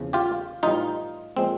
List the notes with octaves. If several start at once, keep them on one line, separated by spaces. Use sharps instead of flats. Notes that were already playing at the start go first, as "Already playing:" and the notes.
Already playing: E2 C#3 F3
F4 G4
A2 E3 G3 D#4 F4
A#2 F3 G#3 C4